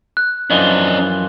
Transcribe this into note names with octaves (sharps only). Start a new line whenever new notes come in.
F#6
F#2 E3 F3 D4 D#5